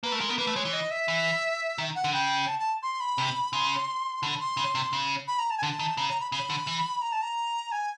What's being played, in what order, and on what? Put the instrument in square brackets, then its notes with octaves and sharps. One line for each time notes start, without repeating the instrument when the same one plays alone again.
[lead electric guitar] A#3 [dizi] B4
[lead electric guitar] A3
[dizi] A#4
[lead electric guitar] G#3
[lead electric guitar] B3 [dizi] A#4
[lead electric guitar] A#3 [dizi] B4
[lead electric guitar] A3
[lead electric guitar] G#3 [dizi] C#5
[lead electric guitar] E3
[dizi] D#5
E5
[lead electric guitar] E3
D#3
[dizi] F#5
[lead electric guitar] D3
[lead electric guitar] C#3 [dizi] G5
[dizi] A5
A5
C6
B5
[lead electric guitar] C3
[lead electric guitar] C#3 [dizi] C6
[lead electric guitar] D3 [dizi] B5
[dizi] C6
[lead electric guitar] C#3
C3
C#3
[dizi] B5
A#5
A5
G#5
[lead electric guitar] D3 [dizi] A5
[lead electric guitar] D#3
[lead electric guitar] C#3 [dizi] A#5
[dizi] A#5
B5
[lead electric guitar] C#3 [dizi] B5
[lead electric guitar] D3
E3
[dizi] A#5
A5
A#5
G#5